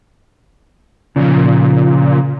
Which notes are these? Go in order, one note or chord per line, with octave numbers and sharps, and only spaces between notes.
A#2 C#3 F3